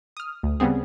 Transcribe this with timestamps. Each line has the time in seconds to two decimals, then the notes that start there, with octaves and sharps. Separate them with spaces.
0.17 D#6 F6
0.43 D2
0.60 C#3 G3 B3 C4 G#4